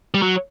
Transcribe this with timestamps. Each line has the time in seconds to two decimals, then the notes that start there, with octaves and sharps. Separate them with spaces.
0.14 G3
0.22 F#3